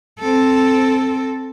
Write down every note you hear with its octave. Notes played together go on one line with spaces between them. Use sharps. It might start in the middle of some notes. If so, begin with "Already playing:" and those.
C4 A4